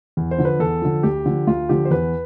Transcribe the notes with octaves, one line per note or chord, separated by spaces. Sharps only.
E2
C5
D3 F3
B4
E2 A4
D3 F3
D2 G4
D3 F3
D2 F4
D3 F3 G4
C5
E2 B4